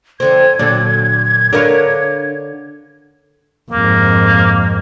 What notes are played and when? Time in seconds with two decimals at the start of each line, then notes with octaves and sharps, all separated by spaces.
0.20 F2 D3 C4 G#6
0.59 A#2 D3 F#3 D4 A4
1.53 D3 D4 A#4 B4 C#5 F5
3.71 F2 G#2 A#3